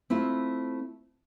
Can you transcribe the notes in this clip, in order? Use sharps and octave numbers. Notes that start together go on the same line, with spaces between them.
A3 C4 E4 F4